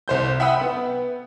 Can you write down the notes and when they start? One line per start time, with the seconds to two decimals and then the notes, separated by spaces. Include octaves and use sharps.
0.08 C2 C5 G6
0.40 E5 F#5 G5 B5 D#6 E6
0.61 B3